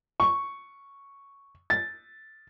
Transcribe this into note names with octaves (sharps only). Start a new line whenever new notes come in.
C#6
A6